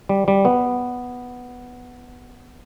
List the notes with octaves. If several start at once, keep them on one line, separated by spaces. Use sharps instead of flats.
G3
G3
B3